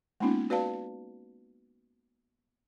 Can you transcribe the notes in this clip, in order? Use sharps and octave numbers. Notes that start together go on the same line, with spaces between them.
G#3 A#3 B3 C#4 D#4 F4
F#4 B4 D5 F5 A5